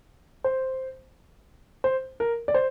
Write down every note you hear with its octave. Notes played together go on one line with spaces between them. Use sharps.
C5
C5
A#4
D5
C5